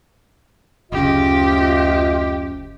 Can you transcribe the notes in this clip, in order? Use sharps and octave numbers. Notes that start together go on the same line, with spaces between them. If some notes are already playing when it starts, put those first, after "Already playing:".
F#1 D2 C#3 F4 G4 D#5